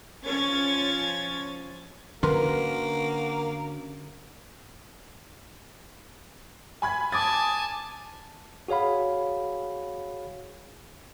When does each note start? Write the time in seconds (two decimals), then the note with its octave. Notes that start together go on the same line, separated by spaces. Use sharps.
0.25 F3 C#4 C#5 G#6 A6
2.23 D3 A#3 C#4 F#4 A#4 B4 C6
6.82 G#5 B5 G#6
7.12 G#5 A5 D6 D#6 A6
8.68 F#4 G#4 C#5 F5 B5